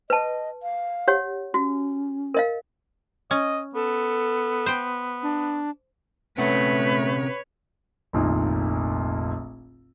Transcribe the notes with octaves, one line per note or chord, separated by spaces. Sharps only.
B4 D#5 A5
F5
G4 C#5 F#5
C#4 F#4
A#4 D#5 F5
C#4 D#5
B3 A4
C5 G5
D4
C3 A3 C#4 B4 C#5 F#5
F1 A#1 A#2 D#3